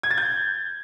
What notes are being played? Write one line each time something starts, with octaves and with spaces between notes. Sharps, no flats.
G#6
A6
G6